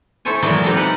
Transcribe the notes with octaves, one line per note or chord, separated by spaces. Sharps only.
E4 A4 C5 C#5 G#5
A#2 E3 F#3 G#3 A#3 B3
G#3 C4 D#4 G4 A4 F5
A#4 B4 F#5